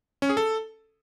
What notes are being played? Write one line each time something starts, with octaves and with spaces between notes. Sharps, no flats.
C#4
G#4
A4